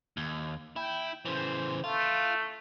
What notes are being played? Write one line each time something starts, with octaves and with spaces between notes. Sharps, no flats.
D#2
E4 G5
C#3 E3 C5
A3 F4